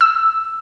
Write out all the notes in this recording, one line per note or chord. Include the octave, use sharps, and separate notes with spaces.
E6